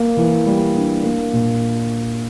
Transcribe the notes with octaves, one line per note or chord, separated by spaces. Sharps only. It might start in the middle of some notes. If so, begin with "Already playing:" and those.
Already playing: A#3
E3
G3
D4
A#3
A#2